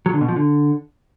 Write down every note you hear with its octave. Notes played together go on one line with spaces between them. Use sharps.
F#3
D3
B2
F3
D3